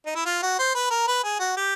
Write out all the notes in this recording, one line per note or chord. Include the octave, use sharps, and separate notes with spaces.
D#4
E4
F4
F#4
C5
B4
A#4
B4
G#4
F#4
G4